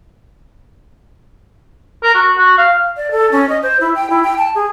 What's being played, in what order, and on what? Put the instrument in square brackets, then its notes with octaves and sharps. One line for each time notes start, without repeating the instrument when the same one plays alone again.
[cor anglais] A#4
F#4
F#4
F5
[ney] D5
A4
C#4
D#5
C5
E4
G5
E4
G5
A5
G#4